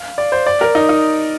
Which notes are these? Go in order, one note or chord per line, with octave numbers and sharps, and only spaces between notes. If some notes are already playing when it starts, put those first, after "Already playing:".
Already playing: F5
D5
C5
D5
A#4
D#4
D#4